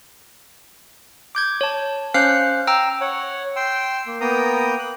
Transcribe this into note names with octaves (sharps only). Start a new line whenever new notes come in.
D6 G6 G#6
C#5 A5
C#4 C5 F5 F6 F#6 C7
G5 A#5 E6
C#5 F#5
G5 C6 E6
A#3
A#3 B3 A#4 G5 A#5 D#6
F#6